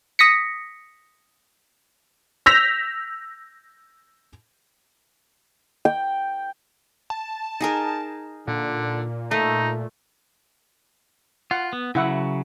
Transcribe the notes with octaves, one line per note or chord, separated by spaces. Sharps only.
D#6 A#6 B6 C#7
E6 G6 A#6 B6 F7
G5
A5
D#4 G#4 A#4
A#2 D3
A3 D#4
F4 F#5
B3
C#3 F#3 E4 F#5